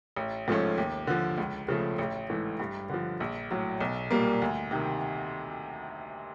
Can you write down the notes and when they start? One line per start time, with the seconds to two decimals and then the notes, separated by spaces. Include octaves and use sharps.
0.17 A1
0.48 G#2 F3 A3 C#4
0.78 D#2
1.07 D3 F3
1.38 C#2
1.68 C#3 F3 A3
1.98 A1
2.30 G#2 E3 A3
2.60 G2
2.89 D3 F3
3.20 A#1
3.51 A2 F#3
3.80 B1
4.11 A#2 G3 A#3
4.42 D2
4.71 C3 D#3